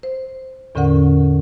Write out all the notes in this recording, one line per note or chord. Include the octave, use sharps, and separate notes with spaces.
C5
E2 A2 D3 C#4 A#4 F#5